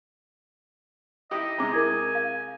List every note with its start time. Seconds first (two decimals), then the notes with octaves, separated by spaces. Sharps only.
1.31 D#4 E4 G4 D#5
1.58 C3 G#3 A#5 D6
1.73 E4 A#4 G#5
2.15 F5